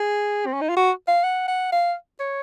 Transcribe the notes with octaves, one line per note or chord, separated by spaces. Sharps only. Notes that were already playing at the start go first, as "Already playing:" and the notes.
Already playing: G#4
C4
C#4
D#4
F4
F#4
F5
F#5
F#5
F5
C#5